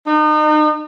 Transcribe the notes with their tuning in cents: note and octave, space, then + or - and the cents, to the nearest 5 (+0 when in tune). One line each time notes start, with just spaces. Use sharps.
D#4 -35